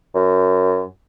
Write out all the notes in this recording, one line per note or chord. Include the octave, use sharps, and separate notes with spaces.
F#2